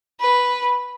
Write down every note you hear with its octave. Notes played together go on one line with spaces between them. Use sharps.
B4